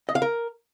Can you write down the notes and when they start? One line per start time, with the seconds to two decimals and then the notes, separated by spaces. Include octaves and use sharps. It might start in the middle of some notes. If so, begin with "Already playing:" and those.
0.09 D#5
0.15 F5
0.22 A#4